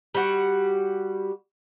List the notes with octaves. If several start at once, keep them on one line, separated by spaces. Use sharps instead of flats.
G3 F#4